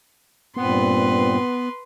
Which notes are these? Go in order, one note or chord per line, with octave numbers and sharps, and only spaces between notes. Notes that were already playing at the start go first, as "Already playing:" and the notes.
G2 A#2 B3 C4 B4 C6